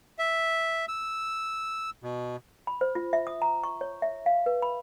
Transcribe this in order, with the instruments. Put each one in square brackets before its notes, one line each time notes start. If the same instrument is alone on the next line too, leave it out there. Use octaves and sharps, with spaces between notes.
[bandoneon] E5
E6
B2
[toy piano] B5
C5
F4
E5
D#6
A#5
C#6
C#5
E5
F5
B4
B5